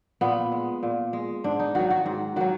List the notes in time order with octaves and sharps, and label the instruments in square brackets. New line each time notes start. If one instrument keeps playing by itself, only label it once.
[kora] A#2 B3
G#3
A#2
G#3
G#2 D4
D#4
D#3 F#3 F#4
F#4
G#2
D#3 F#3 F#4